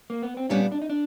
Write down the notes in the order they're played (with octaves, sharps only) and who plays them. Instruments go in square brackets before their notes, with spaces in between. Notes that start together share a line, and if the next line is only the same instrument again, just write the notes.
[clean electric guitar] A#3
B3
C4
[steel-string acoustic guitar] A#2 G3 B3 D4 [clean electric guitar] C#4
[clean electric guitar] D4
D#4
D4